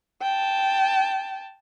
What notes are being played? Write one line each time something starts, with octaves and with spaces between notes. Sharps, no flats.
G5 A5